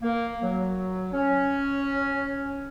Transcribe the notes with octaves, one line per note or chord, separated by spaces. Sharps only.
A#3
F#3
C#4